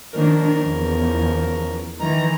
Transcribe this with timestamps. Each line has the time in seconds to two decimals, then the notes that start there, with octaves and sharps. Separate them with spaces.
0.14 D#3 F3 A#3 C#4 D4 A#4
0.62 E2
1.99 D#3 E3 A#5